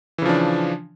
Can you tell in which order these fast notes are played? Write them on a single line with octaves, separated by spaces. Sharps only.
E3 C#3 F3 D4